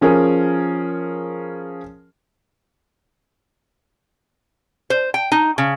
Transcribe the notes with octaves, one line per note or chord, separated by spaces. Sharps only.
F3 C#4 G#4 A#4
C5
G5
D#4
C#3